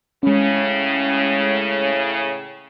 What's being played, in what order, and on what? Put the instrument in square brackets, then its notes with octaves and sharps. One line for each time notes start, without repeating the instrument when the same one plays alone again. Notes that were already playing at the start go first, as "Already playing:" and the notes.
[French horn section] A2 C#3 [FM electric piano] G#3 C#4